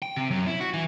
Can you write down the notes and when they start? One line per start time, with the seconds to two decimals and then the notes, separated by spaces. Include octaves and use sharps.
0.02 G5
0.16 C3
0.31 F#2
0.47 E4
0.60 F#4
0.74 E3